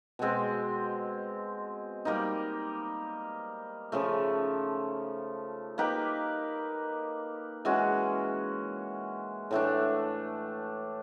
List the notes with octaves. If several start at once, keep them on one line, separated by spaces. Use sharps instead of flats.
B2 G#3 C4
G3 A#3 D#4
C#3 F3 A3
A#3 D#4 G4 B4
E3 G#3 C#4 F#4
A2 E3 A3 D4